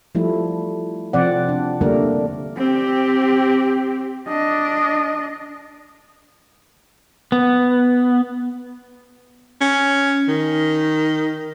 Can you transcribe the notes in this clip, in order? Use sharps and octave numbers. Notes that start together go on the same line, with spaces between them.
F3 G3 A3 E4
C3 F3 C4 D5 F#5
D4
D3 G3 A3 A#3 D4 A#4
C4 G4
D4 D#5
B3
C#4
D#3